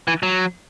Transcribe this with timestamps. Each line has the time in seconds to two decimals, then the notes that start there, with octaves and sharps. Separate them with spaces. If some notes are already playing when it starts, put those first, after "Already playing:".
0.08 E3
0.23 F#3